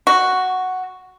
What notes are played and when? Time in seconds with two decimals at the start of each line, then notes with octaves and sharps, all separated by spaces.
0.07 F#4